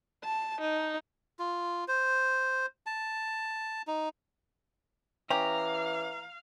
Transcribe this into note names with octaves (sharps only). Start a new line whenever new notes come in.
A5
D#4
F4
C5
A5
D#4
E3 C#4 G4 F5 A#5